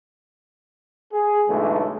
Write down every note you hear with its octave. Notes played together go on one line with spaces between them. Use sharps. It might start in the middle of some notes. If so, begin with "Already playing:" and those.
G#4
B1 D3 E3 G#3 A3